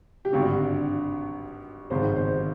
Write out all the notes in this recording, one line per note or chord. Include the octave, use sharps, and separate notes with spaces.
G4
G#1 G2 D3 F#4
G#1 G#2 D#3 C5
C5